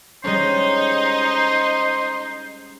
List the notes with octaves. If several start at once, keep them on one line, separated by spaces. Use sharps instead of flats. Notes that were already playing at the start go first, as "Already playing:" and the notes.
G3 G#3 C#4 D#4 C5 D#5